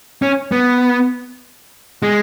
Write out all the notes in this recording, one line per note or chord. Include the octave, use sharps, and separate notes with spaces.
C#4
B3
G#3